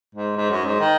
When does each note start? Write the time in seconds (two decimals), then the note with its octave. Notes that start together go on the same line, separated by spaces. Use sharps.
0.15 G#2
0.37 G#2
0.51 F#2
0.65 G#2
0.80 D#3